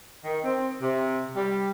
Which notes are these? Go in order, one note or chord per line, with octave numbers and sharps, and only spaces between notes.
D#3
C4
C3
G3